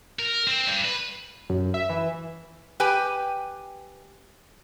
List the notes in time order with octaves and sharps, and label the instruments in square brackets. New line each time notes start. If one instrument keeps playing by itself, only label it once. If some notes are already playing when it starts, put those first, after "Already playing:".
[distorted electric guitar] A#4
C4
G2
B4
[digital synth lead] F#2
E5
E3
[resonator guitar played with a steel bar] G4 B4 G5 G#5